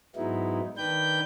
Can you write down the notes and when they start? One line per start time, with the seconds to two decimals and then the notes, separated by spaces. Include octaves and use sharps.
0.16 G#2 F#3 G#3 B3 D#4 E4
0.77 D#3 D4 B4 G5 G6